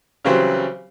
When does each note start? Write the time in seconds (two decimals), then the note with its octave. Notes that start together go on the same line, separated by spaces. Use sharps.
0.25 C#3 E3 F#3 G3 C4 C5